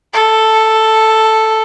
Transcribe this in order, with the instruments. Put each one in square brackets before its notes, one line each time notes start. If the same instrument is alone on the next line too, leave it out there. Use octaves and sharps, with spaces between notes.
[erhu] A4